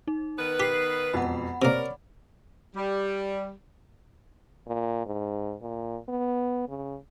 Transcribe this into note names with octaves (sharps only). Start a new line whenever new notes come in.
D#4
D#3 B3 B4
G4 B6 C7
E1 F2 F#5 B5
C3 A#3 A#4 C#5 D5
G3
A#2
G#2
A#2
B3
C#3